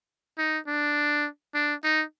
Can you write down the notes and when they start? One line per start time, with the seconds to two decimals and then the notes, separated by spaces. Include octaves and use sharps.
0.38 D#4
0.67 D4
1.54 D4
1.84 D#4